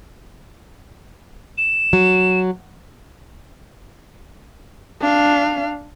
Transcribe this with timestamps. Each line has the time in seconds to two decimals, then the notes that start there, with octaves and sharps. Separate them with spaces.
1.58 E7
1.93 F#3
5.01 D4 F5